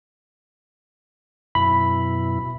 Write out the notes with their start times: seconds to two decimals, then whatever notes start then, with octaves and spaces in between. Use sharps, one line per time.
1.55 F#2 B2 E4 B5